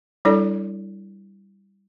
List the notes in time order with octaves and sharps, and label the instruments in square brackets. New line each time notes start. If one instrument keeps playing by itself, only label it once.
[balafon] G3 D4 E4 A4 D5